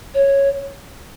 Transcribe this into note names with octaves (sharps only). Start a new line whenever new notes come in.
C#5